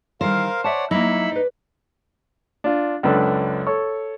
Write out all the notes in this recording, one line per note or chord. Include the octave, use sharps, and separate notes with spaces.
D#3 E3 G3 A#4 C5 F5
C#5 D5 E5 F#5 A5
F#3 A#3 D#4 E4 B5 E6
B4 D5
D4 F4
C#2 F#2 D4 A4 B4 C6
A4 C#5 C#6